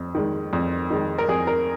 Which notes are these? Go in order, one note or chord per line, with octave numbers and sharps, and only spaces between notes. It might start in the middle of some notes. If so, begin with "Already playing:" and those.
Already playing: F2
D#3 G#3
F2
D#3 G#3
A#4
F2 G#4
A#4